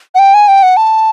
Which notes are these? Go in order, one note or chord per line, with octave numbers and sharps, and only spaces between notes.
F#5
G5
G#5
G5
F#5
A5